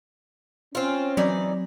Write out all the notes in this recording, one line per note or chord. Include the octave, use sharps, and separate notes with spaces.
C4 C#4 F4
E3 F#3 C4 D#4 D5